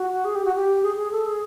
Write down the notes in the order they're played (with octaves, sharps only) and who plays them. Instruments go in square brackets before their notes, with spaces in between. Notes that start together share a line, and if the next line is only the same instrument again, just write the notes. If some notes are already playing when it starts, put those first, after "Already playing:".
Already playing: [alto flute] F#4
G#4
G4
F#4
G4
G#4
G#4
A4
G#4